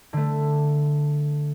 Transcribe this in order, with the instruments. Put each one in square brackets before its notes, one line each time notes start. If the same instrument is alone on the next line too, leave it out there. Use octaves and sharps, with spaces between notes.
[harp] D3 A3